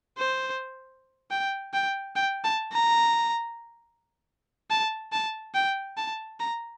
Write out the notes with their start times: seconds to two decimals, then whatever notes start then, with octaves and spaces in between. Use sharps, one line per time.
0.18 C5
1.31 G5
1.73 G5
2.16 G5
2.44 A5
2.73 A#5
4.70 A5
5.13 A5
5.54 G5
5.97 A5
6.40 A#5